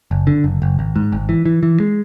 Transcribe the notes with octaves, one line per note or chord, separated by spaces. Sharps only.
F#1
D3
F#1
F#1
G#1
G#2
G#1
E3
E3
E3
G#3